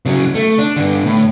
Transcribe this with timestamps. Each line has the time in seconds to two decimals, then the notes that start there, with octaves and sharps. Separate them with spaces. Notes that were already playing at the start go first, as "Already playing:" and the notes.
0.06 C#3 F#3
0.35 A3
0.58 D4
0.76 G2 D3
1.06 A2